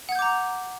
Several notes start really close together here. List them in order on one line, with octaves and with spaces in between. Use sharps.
F#5 G#6 G6 D6 A#5